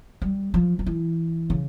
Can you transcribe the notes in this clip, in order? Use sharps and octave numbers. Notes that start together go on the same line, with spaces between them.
G3
F3
F3
E3
C#3